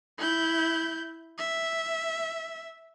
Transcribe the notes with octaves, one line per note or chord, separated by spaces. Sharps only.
E4 G6
E5